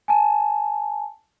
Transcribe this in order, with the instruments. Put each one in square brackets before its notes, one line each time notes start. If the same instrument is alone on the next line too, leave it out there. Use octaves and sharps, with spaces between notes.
[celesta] G#5 A5